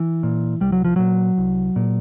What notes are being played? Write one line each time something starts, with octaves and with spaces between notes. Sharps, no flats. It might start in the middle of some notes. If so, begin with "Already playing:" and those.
Already playing: E3
A#2
C2 G3
F#3
F3
A#2 F#3
C2
A#2